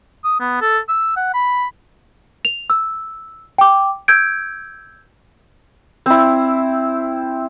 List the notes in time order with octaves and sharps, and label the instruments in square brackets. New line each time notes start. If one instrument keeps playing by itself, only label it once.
[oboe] D#6
B3
A4
E6
F#5
B5
[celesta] F7
E6
G5 D6
E6 G6 G#6 D7
[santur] C4 E4